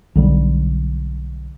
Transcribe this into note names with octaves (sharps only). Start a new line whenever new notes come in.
B1 D3 G3